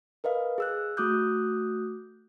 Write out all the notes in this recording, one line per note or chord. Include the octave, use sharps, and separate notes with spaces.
A#4 B4 D#5 F5
G#4 E6 F#6
A3 F#4 D6 D#6 F#6 G6